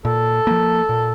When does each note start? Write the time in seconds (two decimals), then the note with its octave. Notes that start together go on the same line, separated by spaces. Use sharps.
0.05 A#2 A4
0.47 F3 A#3
0.89 A#2